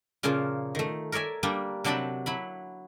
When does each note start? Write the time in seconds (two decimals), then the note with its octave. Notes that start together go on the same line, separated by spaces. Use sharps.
0.23 A#2 C#3 F3 A#3 F4
0.75 D#3 A3
1.12 A#4 C#5 D5 E5 G#5
1.43 G3 A#3 D4 G5
1.84 C3 F#3 D4 G5 A5 B5
2.26 F#3 E4 B5